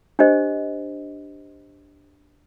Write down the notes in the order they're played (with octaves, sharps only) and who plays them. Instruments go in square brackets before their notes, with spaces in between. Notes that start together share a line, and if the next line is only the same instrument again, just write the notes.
[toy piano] D4 G4 C5 D#5